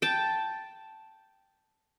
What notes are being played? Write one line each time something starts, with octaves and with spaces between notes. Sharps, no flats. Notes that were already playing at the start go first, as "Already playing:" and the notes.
G5 A5